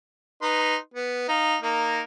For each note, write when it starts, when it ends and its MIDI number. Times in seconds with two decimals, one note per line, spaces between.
0.42 0.76 63
0.42 0.76 71
0.42 0.76 84
0.94 1.27 59
1.29 1.56 63
1.29 1.56 77
1.62 2.02 58
1.62 2.02 63
1.62 2.02 70